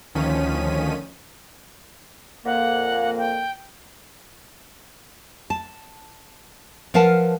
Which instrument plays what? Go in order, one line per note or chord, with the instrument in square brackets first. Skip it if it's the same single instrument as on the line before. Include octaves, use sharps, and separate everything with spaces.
[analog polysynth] D2 D#3 F3 C#4 B6 D#7
[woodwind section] F2 A#2 A#3 [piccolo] F#5
[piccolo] G5
[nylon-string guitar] A5
F3 A#4 B4 F5 F#5 A5